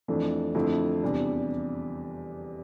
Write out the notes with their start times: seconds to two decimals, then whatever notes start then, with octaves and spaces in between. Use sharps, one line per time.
0.08 F2 E3 A3 D4
0.55 F2 D3 A3 E4
1.02 E2 C3 G3 D4